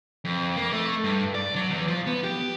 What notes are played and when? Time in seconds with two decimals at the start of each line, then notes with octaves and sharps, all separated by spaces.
0.25 F2
0.57 A#3
0.73 A3
1.04 G2
1.35 D5
1.56 F#3
1.70 E2
1.88 F3
2.06 B3
2.24 G4